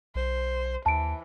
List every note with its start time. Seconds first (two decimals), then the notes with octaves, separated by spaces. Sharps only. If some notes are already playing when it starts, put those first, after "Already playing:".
0.15 B1 C5
0.86 D#2 E3 A5 D7